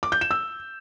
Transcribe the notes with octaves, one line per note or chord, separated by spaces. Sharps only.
D6
G6
E7
E6